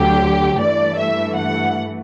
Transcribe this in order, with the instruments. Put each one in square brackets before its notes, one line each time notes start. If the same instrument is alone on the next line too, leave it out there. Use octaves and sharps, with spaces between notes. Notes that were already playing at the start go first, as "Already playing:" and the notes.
Already playing: [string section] D2 D3 F#3 G4
G2 E3 A3 D5
E5
F#5